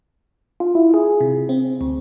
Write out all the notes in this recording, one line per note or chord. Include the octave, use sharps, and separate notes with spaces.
F4
E4
G#4
C3
C4
D2